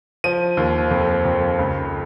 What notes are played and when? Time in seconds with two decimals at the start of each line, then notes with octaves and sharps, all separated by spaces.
0.24 F3 D#7
0.57 D#2
0.91 F2
1.25 F2
1.59 C#2